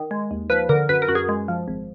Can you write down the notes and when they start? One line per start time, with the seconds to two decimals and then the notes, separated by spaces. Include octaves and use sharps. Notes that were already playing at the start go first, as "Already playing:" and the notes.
Already playing: D#3
0.11 G#3
0.31 D#2
0.50 F3 B4
0.69 D3 A#4
0.89 F#2 B4
1.02 A#4
1.09 F#2 F#4
1.15 G#4
1.29 G#3
1.48 F3
1.68 G#1